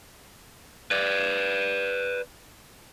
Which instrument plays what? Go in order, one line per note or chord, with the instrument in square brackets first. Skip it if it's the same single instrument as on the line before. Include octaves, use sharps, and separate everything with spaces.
[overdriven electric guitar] B4 D5